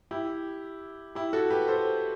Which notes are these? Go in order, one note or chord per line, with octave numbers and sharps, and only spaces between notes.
E4 G4
E4 G4
F#4 A4
G4 B4
A4 C5